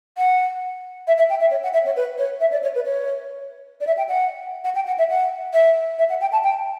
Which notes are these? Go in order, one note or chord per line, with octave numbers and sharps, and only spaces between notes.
F#5
E5
E5
G5
E5
C#5
F#5
E5
C#5
B4
C#5
E5
D5
C#5
B4
C#5
D5
E5
G5
F#5
F#5
G5
F#5
E5
F#5
E5
E5
F#5
G5
A5
G5